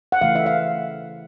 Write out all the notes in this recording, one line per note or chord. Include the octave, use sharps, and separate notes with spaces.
F#5
C#3 E3 A3 F5
E5
F5